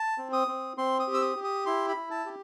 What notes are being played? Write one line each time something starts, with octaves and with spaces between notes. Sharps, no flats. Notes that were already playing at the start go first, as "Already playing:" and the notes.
Already playing: A5
C4
D#6
C4
C4 C6
D#6
G4
E6
D#6
G4
D#6
E4 C6
B5
E4
A5
G4